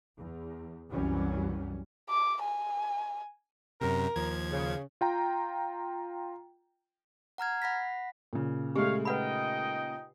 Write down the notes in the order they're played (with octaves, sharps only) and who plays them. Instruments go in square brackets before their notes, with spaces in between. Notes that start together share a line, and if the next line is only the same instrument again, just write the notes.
[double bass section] E2
C2 F#2 E3 F#3 G3 C#4
[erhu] D6
G#5
[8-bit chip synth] F#2 C3 [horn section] A#4 A#5
[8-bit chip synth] D#2 F3 G#6
[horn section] C#3
[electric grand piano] F4 G5 A#5
[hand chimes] F#5 A#5 F6 G#6
F#5 B5 A#6 B6
[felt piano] A#2 C#3
[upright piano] G#3 A3 [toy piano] G4 [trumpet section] C#5 F5
[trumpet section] D#4 D#5 G5 [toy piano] B4 F#5 B5